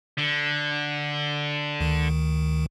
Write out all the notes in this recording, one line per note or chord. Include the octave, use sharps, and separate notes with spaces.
D3
D2 D#3